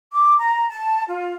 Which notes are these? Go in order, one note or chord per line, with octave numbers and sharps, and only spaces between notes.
D6
A#5
A5
F4